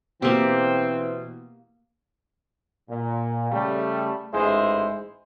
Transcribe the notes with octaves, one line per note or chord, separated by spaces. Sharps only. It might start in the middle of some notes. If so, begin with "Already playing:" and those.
B2 E3 A#3 C4 G4
A#2
C#3 G3 A3
A1 G#2 G#3 E4 G#4 C5